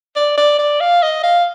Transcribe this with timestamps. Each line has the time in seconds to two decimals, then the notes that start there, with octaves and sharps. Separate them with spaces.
0.16 D5
0.37 D5
0.59 D5
0.80 F5
1.02 D#5
1.23 F5